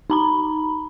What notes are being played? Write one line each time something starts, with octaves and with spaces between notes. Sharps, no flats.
D#4 A#5 B5